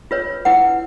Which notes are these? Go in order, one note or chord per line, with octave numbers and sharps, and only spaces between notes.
F4 B4 C#5
E4 B4 F#5